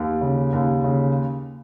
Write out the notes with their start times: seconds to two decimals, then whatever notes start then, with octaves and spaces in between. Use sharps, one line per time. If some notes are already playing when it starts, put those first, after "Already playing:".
Already playing: D#2
0.21 C#3
0.53 D#2
0.84 C#3